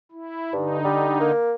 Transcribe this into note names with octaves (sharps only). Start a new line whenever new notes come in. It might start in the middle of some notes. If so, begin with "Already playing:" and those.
E4
G2 D3 D#4
G3
A#3